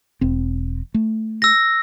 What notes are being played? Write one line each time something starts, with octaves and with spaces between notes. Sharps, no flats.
E1 C4
A3
E6 A#6